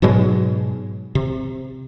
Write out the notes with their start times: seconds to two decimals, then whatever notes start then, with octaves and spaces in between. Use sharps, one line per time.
0.02 G#2 B2 F#3 G#3
1.15 C3